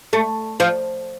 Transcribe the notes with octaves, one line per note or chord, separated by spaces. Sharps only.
A3
F3